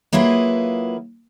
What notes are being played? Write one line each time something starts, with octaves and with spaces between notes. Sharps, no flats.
F#3 A#3 E4 F4 G#4 B4